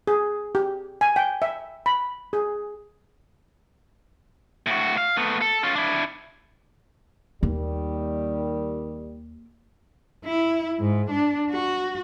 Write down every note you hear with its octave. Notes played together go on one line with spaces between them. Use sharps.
G#4
G4
G#5
G5
E5
B5
G#4
A2 F#4
F5
A3 B3
A4
C#4 F4
D4 E4
D#2 D#3 G3 A#3
E4
G#2
D4
F#4